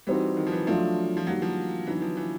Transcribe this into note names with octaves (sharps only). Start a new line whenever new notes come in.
E3 G3 C4 D#4 F#4
D#3
F3
E3
F3 F#3 A3 D4 F4
F3
D#3 F#3 G3 A#3 D4 F#4
F3
D3 E3 F#3 B3 D#4
F3
E3